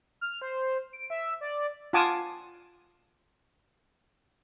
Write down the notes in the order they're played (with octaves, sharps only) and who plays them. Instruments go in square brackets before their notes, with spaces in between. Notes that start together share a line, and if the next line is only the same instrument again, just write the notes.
[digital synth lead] F6
C5
D7
E5
D5
[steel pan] F4 F#5 G#5 A5 D6 D#6